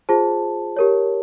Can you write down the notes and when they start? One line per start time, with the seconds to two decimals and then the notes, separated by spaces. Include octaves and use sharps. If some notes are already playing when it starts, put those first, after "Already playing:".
0.09 F4 G#4 C5 A5
0.77 G4 A#4 C#5